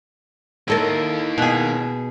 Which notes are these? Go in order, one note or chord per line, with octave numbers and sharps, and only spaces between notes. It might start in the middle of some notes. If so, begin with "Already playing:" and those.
A#3 D#4 E4 A4 A#4
B2 G#4